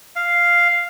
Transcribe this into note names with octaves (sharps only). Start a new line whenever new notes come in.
F5